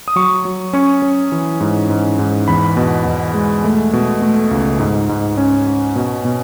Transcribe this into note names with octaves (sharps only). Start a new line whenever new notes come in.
D#6
F#3 C#6
F#3
C#4 C#6
C#4
E3
G#2
G#2
G#2
E2 B5
B2
E2
G#3
A3
B2
A3
C#2
G#2
G#2
C#4
C#4
B2
B2